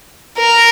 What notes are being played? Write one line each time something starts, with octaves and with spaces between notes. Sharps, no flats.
A#4